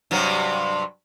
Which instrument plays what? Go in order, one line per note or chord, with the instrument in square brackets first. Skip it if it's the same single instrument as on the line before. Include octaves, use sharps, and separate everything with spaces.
[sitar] G2 C3 F#3